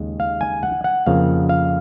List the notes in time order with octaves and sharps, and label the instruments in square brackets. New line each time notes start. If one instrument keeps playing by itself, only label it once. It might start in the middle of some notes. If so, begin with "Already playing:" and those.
Already playing: [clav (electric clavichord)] D#2 C#3 G#3
F5
G#5
F#5
F#5
F2 C#3 F3 A#3 F5
F5